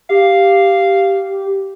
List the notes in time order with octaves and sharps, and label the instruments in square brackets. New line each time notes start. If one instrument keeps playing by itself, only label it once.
[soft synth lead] G4 [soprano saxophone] F5